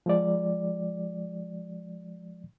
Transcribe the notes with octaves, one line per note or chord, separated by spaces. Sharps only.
F3 G#3 D5